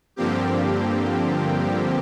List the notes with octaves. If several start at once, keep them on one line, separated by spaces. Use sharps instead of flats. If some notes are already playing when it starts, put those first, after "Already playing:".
G2 D3 F3 A#3 C4 G4